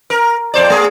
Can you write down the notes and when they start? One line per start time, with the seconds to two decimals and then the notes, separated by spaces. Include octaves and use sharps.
0.10 A#4
0.54 F2 C5 D5
0.70 A3 G#4